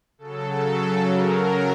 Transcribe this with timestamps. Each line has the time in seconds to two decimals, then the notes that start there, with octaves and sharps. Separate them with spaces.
0.18 C#3 F#3 A4
1.05 C#3 F#3 A#4